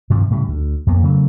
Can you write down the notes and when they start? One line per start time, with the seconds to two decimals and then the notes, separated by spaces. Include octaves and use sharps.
0.10 G2 C3 D#3 F3
0.30 A2 C#3 G3
0.48 D2
0.87 F2 A#3 B3
1.03 C#3 F#3 A3